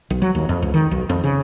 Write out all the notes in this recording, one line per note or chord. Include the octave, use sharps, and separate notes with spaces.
B1
F#3
D#2
F2
C#2
D#3
B1
F2
C#3